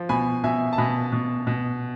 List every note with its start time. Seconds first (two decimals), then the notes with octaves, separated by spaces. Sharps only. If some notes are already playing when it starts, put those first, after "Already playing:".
Already playing: F3
0.09 B2 G#5 B5
0.44 B2 E5 G#5
0.73 A5
0.78 B2 G#5 B5
1.13 B2
1.47 B2